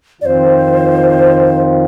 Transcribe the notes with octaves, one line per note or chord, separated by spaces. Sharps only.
F2 D#3 C4 F4 C5 D5